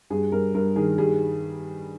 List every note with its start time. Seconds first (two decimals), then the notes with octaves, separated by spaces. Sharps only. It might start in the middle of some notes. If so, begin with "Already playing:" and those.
0.10 G2 G#4
0.32 G2 A#4
0.54 G2 A#4
0.76 D#3 G#4
0.98 G3 G#4